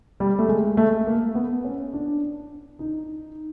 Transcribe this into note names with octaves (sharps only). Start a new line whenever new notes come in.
G3
A3
G#3
A3
A#3
B3
C#4
D4
D#4